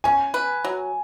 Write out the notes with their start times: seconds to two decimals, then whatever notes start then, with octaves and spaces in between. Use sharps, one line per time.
0.04 C#4 G#5
0.34 B4
0.65 F#3